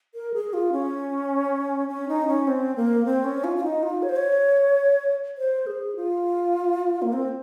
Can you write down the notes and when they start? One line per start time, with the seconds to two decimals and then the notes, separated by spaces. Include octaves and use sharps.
0.15 A#4
0.34 G#4
0.53 F4
0.72 C#4
1.88 C#4
2.09 D#4
2.27 C#4
2.47 C4
2.76 A#3
3.05 C4
3.24 C#4
3.44 F4
3.57 F4
3.64 D#4
3.83 F4
4.03 C#5
4.09 C5
4.16 C#5
5.38 C5
5.67 G#4
5.96 F4
7.02 A#3
7.13 C4